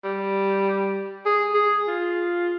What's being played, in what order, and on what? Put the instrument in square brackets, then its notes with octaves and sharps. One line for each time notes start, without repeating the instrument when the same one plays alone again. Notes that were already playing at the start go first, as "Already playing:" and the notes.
[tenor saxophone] G3
G#4
G#4
F4